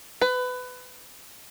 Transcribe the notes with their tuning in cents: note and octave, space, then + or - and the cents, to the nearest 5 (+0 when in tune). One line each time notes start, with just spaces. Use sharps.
B4 +20